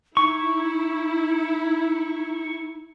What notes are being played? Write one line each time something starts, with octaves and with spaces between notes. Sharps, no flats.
D#4 E4 C#6